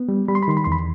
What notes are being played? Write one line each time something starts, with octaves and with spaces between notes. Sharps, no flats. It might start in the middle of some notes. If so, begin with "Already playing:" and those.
Already playing: B3
G3
G3 B5
C6
B5
D#3 C6
B5
E2 C6
B5